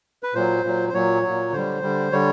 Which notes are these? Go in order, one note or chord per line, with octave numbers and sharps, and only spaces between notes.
B4
A#2 F#3 C5
A#2 F#3
C5
A#2 F#3 C#5
F#3
A#2
D3 G3 C5
D3 G3
D3 G3 C#5